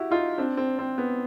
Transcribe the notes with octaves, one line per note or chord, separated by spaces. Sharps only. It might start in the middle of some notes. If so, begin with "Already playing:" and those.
Already playing: E4 F#4 G4
D#4 F4
C4 D4
C4
C4
B3